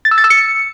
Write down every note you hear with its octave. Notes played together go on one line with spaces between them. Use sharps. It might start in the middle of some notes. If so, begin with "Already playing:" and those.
A6
E6
A6
E6
C#7